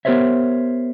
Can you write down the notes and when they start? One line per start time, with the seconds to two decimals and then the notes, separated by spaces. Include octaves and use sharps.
0.05 B3 G4 A#4 C5 C#5 E5